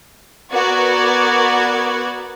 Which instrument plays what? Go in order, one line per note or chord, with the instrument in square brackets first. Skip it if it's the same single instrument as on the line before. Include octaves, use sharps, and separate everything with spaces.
[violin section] B3 F#4 A#4 D5 G#6